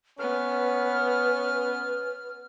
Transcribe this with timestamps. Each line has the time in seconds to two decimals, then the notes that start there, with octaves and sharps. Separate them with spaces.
0.19 B3 C#4 B4 F6